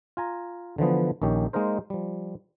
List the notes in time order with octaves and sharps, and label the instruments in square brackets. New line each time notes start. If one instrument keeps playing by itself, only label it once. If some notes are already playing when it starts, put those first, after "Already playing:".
[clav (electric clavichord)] F4 G#5 A#5
D3 E3 F3 B3
A#1 D#3 C#4 G4
G#3 A#3 D#4 A#4 C5
F3 G3